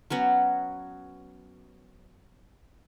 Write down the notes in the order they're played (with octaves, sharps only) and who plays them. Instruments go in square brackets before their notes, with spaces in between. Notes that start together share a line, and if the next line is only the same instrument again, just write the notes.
[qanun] F#3 B3 C#4 F#4